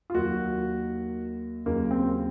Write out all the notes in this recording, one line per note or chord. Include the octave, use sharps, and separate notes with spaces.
F4
D#2 D#3 F#3 F#4
D#2 C#3 F#3 A#3
C4